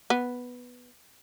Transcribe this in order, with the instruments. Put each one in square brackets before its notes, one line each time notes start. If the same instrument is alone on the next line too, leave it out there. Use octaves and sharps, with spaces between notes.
[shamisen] B3